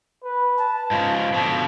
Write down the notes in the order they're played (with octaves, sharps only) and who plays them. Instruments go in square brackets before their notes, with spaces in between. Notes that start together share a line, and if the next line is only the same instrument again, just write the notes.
[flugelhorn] B4
[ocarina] A5
[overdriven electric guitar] G#2 C#3 [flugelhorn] F4
[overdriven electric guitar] B2 D3 [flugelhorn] F3